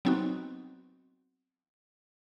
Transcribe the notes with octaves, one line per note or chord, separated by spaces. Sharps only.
F#3 B3 C4 D#4 F#4